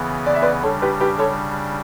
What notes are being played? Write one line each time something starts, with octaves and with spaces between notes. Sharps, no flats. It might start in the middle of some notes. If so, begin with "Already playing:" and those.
Already playing: C#3 E3 B3
D5
E5
B4 D5
C#3 G3 D4 A4 C#5
G4 B4
G4 B4
A4 C#5